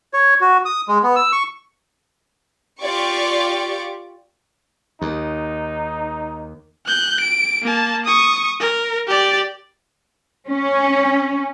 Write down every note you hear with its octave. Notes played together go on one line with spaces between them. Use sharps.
C#5
F#4
D#6
G#3
B3
E6
C#6
F4 G4 D5 C#6 D6
D#2 D#4
F#6 G6
D7
A#3 A5
C#6 D#6
A#4
G4 D5
C#4